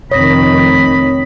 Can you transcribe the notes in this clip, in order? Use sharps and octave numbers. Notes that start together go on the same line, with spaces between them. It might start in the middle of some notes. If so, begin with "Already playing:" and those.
F1 D#3 C4 C#5 B5 D#6 A#6